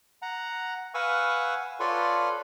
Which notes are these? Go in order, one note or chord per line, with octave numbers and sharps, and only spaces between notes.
F#5 A#5
B4 F5 F#5 G#5 C#6 E6
F4 A4 B4 C#5 D5 C6